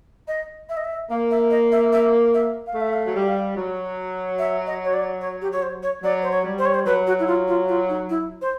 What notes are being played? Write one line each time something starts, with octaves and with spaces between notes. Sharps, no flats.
D#5
E5
D#5
E5
A#3 F5
E5
D#5
E5
E5
E5
F5
A3
E5
F5
F#3
G3
F#3
E5
D#5
C#5
D5
C#5
G4
C#5
C5
C#5
F#3 D5
C5
C#5
G3
C5
C#5
C5
F#3 B4
F#4
E4
F4
F4
F4
D#4
E4
C5